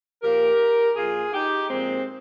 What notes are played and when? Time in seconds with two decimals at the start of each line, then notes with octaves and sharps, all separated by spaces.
0.22 A#2 F3 G4 A#4
0.96 A#2 F3 F4 G#4
1.33 D#4 G4
1.69 A#2 F3 G#3 C4